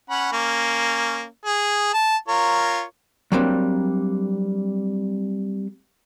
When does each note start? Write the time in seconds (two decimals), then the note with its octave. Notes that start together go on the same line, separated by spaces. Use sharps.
0.10 C#4 F#5 B5
0.32 A#3 C#4
1.45 G#4
1.94 A5
2.28 F4 A#4 C#5
3.32 F#3 G3 A#3 C4 D4